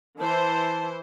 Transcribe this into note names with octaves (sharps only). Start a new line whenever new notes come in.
E3 C5 A5